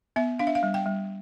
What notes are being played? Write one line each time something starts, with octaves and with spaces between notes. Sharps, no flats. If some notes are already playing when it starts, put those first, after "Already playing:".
B3 E5
D4 F5
E5
F5
G3
G5
G3